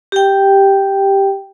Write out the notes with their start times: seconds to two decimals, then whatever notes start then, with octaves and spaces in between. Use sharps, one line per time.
0.12 G4 G5